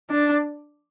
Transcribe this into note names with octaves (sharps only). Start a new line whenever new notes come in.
D4